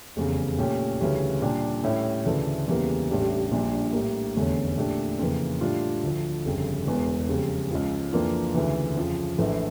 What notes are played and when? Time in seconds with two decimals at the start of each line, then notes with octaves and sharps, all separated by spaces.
0.16 F1 E2 C#3
0.58 A#2 A3 C#4 G4
1.01 D2 C#3 E3 G3 C#4
1.42 A#2 G3 D4 G4
1.84 A2 G3 C#4 E4 G4
2.26 D2 C#3 E3 A3 D4
2.68 E2 C#3 E3 G3 A#3
3.10 A1 A2 G3 D4
3.52 A#1 A#2 G3 D4
3.93 A2 G3 A#3
4.35 F1 E2 D3 A3 C#4
4.77 A#2 A3 D4 G4
5.19 F2 C#3 E3 A#3
5.61 A2 G3 D4 F4
6.03 D2 D3 F3
6.45 G1 F2 C#3
6.87 E1 E2 E3
7.29 F2 C#3 G3
7.71 C#2 C#3 F3
8.13 F2 E3 A#3 D4 F4
8.54 D2 C#3 E3
8.96 F2 C#3 F3
9.38 A#1 A2 E3 A3